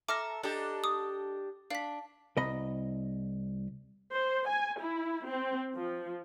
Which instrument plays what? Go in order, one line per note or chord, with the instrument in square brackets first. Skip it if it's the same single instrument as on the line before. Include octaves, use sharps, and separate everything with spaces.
[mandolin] A4 E5 A#5 [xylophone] D6 F6 A#6
[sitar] D4 G4 [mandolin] A4 D#5 A#5
[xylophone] D6 D#6
[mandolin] D4 [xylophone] F5 B6
[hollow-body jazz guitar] C2 D#5 B5
[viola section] C5
G#5
E4
C4
F3